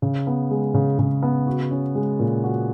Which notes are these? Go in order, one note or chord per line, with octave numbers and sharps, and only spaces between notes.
C#3
B3
G#3
C#3
C#3
B3
F#4
C#4
G#3
A#2
F#4